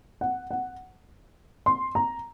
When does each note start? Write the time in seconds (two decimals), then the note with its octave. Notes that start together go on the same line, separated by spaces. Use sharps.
0.21 F#5
0.51 F#5
1.66 C6
1.95 A#5